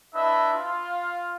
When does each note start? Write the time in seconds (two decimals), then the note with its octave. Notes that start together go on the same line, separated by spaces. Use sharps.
0.14 D4 E4 B4 D#5 E5
0.54 F4